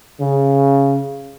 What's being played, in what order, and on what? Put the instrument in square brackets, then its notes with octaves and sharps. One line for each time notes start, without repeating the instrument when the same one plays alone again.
[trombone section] C#3